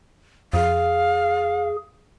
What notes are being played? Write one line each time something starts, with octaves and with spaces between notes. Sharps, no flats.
F2 G#4 F5